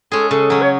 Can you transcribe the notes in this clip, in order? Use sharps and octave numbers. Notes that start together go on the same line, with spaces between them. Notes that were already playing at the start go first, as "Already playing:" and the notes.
G#3 C#4 G#4 A4
C#3 A4
F#3 C#4
C#5